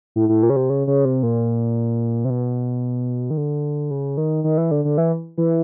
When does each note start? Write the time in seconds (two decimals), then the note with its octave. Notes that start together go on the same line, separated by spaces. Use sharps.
0.16 A2
0.29 A2
0.43 A#2
0.50 C#3
0.56 C3
0.70 C#3
0.87 C#3
1.05 C3
1.23 A#2
2.25 C3
2.30 B2
3.30 D#3
3.37 D3
3.91 C#3
4.17 D#3
4.44 D#3
4.58 E3
4.71 D3
4.85 D3
4.98 E3
5.38 E3